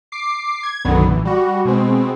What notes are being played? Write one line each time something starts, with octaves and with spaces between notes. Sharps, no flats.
D6 C7
G#6
B1 F#2 D3 D#3 F#3 B3
A#1 E3
G3 F#4
B2 G#3 C4